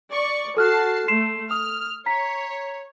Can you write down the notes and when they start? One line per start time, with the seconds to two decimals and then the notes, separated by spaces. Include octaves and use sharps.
0.11 D5 C#6
0.57 F#4 A4 A5 F6 F#6 C7
1.08 A3 C6 C7 E7
1.51 D#6 F6
2.06 C#5 A#5 B6